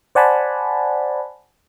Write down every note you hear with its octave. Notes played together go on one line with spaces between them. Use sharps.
C5 D5 F#5 G#5 A5 B5